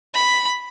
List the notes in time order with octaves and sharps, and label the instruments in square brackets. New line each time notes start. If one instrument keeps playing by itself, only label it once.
[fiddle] B5